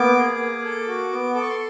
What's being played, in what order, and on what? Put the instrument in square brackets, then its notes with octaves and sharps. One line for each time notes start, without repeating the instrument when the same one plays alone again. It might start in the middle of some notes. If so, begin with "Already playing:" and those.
Already playing: [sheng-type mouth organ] A#3 B3 D6
G#4
A#3
A4
F#4
B3
A4 D6
C#6
C6